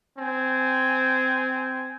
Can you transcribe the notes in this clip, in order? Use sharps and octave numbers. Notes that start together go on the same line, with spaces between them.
C4 G#5